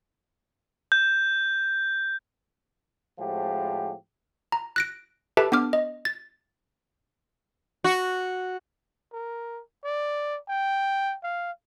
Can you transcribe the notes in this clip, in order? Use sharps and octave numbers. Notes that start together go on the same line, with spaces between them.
G6
A2 F3 G#3 C4 F#4 G4
A#5
F#6 A#6 D7
G4 A4 B4 E5 A5
B3 D4 D6 F6
D#5
A6
F#4
A#4
D5
G5
F5